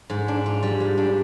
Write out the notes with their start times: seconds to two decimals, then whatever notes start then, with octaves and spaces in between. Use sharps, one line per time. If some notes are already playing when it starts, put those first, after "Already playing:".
0.10 G#2
0.28 D4
0.46 F4
0.63 G3
0.80 G#2
0.98 D4